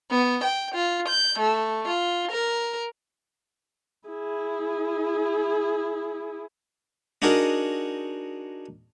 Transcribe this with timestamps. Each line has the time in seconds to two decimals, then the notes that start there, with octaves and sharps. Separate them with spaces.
0.12 B3
0.44 G5
0.75 F4
1.08 G6
1.39 A3
1.88 F4
2.33 A#4
4.09 E4 G#4
7.22 D4 D#4 F#4 G#4 A#4